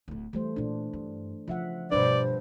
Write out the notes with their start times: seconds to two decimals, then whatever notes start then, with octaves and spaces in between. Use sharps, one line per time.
0.08 D1 D2
0.33 E3 G3 A3 C5
0.56 A#2 D4 F4
0.93 G2
1.48 C#3 F3 E5 F#5
1.91 G2 B2 G3 D4 B4 C5 D5